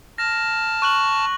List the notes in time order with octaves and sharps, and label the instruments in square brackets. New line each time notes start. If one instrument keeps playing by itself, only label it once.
[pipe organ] A5 F6 [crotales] A#6
[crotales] C#6 F#6 F#7